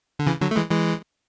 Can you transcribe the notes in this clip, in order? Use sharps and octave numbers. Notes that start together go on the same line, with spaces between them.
D3
C#3 E3
D3 F#3
A3
E3 G#3
E3 G#3